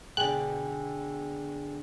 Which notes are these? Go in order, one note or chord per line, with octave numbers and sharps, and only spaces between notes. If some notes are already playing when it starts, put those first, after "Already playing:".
B2 D3 G#4 G5 G#5 F#6